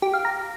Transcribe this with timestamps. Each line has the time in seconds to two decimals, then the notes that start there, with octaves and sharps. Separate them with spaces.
0.02 G4
0.14 F5
0.25 A#5